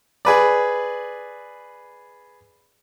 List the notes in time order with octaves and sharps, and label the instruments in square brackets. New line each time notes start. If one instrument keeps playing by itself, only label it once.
[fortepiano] G#4 B4 D5